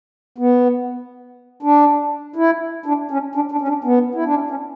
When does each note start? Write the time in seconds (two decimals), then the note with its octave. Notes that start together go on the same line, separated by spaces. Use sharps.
0.38 B3
1.62 D4
2.36 E4
2.86 D4
3.11 C#4
3.35 D4
3.52 D4
3.61 C#4
3.68 D4
3.84 B3
4.15 E4
4.25 D4
4.34 C#4
4.50 C#4